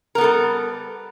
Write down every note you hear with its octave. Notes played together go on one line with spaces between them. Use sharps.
G3 B3 A4 A#4